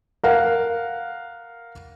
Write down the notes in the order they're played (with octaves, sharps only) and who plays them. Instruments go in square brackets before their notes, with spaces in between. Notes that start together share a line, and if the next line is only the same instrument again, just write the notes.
[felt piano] A#4 F5 F#5